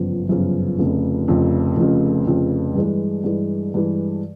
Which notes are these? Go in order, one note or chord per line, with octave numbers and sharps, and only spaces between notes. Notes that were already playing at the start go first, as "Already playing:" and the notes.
Already playing: G1 F#2 C#3 F3
G1 F#2 C#3 F3
F1 F2 C#3
F1 F2 C#3
F1 F2 C#3
F1 F2 C#3
G2 E3 G#3
G2 E3 G#3
G2 E3 G#3